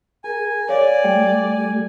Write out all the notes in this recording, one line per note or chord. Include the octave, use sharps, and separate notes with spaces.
G#4 A#4 G#5
C#5 D5 F5
G3 A3 G5